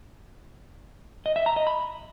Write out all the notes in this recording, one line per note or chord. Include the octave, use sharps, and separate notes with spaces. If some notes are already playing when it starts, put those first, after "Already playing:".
D#5
E5
A#5
D#5
B5